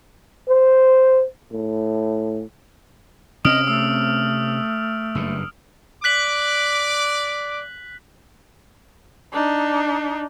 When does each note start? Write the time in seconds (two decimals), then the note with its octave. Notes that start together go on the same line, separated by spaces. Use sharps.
0.48 C5
1.52 A2
3.45 C3 C4 C#4 D#5 D#6 F6 D7
3.68 A3 E6
5.15 F#1 G2
6.04 D5 D6 F#6 B6 F#7
9.33 D4 D#4